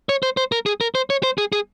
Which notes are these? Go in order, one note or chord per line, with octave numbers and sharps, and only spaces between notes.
C#5
C5
C5
A#4
G#4
A#4
C5
C#5
C5
G#4
G#4